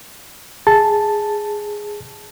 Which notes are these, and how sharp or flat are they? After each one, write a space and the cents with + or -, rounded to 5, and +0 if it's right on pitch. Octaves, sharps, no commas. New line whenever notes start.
G#4 +0 A5 +0